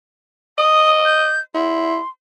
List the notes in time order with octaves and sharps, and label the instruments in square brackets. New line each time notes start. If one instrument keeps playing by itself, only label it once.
[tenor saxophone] D#5 [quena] D#6
[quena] G6
[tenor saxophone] E4 [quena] C6